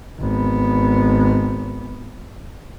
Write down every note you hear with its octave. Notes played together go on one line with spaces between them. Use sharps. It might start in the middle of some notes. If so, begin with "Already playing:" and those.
G#1 B3